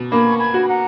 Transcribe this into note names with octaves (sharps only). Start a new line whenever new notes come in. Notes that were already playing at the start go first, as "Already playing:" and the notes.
Already playing: B2
A#3 G#5 B5
C#6
G#5 B5
F#4
B5
F#5 A#5